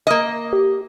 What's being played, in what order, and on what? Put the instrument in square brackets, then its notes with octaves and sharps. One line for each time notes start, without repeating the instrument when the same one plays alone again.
[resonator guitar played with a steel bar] A#3 D#5
[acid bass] G4